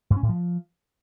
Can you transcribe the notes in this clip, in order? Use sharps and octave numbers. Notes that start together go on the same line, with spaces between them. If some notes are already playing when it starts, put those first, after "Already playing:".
G2
C#4
A2
F3